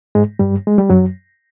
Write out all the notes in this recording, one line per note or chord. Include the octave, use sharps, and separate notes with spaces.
G#2 G#3
G2 G3
G#3
G3
F#2 F#3